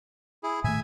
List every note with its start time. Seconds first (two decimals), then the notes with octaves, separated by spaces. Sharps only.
0.43 E4 G#4
0.64 A2 D#3 A3 E5 G#5